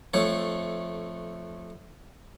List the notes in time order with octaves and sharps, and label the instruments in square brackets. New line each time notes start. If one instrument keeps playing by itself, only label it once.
[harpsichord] F2 A3 C#5